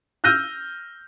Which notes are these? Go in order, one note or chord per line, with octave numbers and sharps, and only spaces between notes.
E6 F6 G6 A#6 D#7